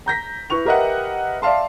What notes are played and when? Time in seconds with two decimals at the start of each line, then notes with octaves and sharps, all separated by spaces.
0.06 A#5 G6 A#6 B6
0.50 E4 B4 C#6 F7
0.65 G4 A#4 B4 D#5 E5 F#5
1.42 D5 E5 F5 A5 C6